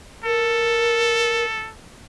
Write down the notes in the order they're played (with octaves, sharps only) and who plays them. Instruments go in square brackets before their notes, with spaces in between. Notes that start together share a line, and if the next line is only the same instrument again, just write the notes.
[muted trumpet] A4 [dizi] A#4